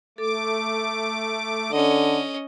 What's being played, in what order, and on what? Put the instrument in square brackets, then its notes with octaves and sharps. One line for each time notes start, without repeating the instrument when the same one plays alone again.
[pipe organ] A3 D6 [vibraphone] A4
[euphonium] D3 [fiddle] C#4 D#5